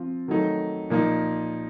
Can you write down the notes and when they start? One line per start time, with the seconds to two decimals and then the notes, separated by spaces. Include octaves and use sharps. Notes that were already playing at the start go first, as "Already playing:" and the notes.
Already playing: F3 C4 F4
0.28 D#3 F#3 A3 D#4
0.90 A#2 F3 A#3 D#4